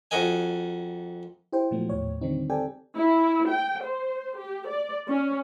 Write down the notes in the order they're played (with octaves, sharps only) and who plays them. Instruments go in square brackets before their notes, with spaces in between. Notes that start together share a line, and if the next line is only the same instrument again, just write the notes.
[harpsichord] F2 F#4 A#4 D#5 G#5
[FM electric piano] E4 G4 C5 G5
A#2 F3 F#3 A3 B3
D#2 A2 C#5
D3 D#3 G3 C4 D#4
C4 G4 A4 D5 G5 G#5
[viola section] E4
G5
C5
G4
D5
C#4